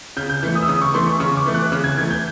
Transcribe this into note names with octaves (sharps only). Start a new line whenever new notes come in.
C#3 G6
G6
E3 A3
D#6
E6
C#3 D#6
C#6
E3 A3 C6
C#6
C#3 C#6
D6
E3 A3
F#6
C#3
G#6
E3 A3 G#6
G6